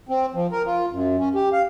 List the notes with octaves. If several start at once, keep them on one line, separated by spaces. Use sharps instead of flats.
C4
F3
A#4
F4
F#2
C#4
G4
F5